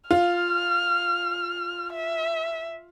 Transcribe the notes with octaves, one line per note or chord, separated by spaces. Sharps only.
F4 F6
E5